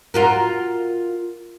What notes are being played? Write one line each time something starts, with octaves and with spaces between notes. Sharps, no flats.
F4 F#4 A#4